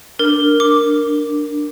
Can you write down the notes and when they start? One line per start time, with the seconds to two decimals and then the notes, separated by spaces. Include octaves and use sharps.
0.19 D4 A#4
0.60 D6